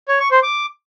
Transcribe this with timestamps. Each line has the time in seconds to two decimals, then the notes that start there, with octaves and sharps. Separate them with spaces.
0.08 C#5
0.20 C#6
0.31 C5
0.43 D6